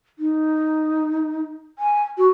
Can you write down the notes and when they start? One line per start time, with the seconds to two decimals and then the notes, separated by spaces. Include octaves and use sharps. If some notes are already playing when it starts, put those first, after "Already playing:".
0.19 D#4
1.79 G#5
2.18 F#4